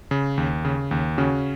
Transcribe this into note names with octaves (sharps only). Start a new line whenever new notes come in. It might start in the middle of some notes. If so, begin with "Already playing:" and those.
C#3
D#2
C#3
D#2
C#3 C#4 F#4